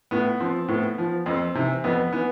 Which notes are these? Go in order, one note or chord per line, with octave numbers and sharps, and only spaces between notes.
A2 B3
F3 C4
A2 B3
F3
F2 C4
C3 E3
F2 B3
E3 B3